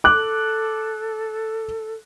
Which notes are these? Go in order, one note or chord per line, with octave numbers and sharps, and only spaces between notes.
A4 D6 F#6